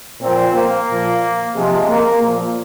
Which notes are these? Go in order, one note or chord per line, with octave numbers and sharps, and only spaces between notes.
A#2 F3 C4
A#3
A#2 F3
C3 F3 G#3
A#3
A#2 F3